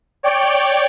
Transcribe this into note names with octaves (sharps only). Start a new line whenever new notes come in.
C#5 D5 G5